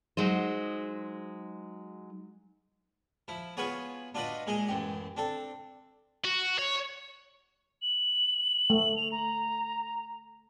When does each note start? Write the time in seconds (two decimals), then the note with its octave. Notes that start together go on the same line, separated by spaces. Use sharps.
0.17 F#3 G#3 D#4 C5
3.28 F3 E4
3.57 B3 F4 F#4 G#4 B4 C#5
4.15 D4 F4 F#4 B4 D5 D#5
4.47 A#2 G#3 G#4 D#5
4.68 A1 F#2 G4
5.17 C4 D4 A4
6.25 F#4
6.59 C#5
7.82 F#7
8.70 A3
8.97 F7
9.12 A#5